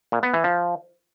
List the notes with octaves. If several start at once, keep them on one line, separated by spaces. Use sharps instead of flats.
A#2
B3
E3
F3